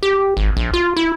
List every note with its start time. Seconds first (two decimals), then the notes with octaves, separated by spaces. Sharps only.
0.03 G4
0.37 G#1
0.57 A#1
0.74 F4
0.96 E4